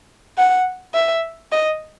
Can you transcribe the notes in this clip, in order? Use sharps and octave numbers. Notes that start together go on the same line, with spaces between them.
F#5
E5
D#5